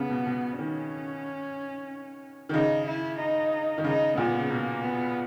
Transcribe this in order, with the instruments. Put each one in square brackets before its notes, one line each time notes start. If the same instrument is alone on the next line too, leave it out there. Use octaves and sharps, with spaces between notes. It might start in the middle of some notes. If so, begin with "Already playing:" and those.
Already playing: [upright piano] C#3 [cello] B3
[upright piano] B2
B2
[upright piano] D#3 [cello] C#4
[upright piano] D#3
[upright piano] C#3 [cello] D#4
[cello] E4
D#4
[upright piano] D#3
[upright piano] C#3 [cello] D#4
[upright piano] A#2 [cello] B3
[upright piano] C#3
[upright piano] B2 [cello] A#3
[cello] B3